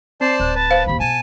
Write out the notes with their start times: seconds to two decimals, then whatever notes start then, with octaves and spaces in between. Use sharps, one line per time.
0.21 C4 C5 D5 A5 C7
0.40 D1 F#6
0.55 B4 A5
0.71 C5 F5
0.87 D#2 E4 B5
1.00 B2 B3 G#5 A5 D#7